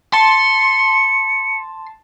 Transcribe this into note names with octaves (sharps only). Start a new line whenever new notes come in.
A5 C6 C#7